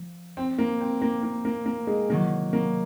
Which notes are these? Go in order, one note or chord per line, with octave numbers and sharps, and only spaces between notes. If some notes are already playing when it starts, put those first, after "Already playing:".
Already playing: F3
C4
A#3
C4
A#3
A#3
A#3
A#3
G#3
C3 D#3 F#3 A#3
A#3